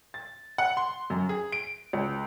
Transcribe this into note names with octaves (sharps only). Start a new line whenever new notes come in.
A6
F#5
C6
F#2
G#4
D7
C#2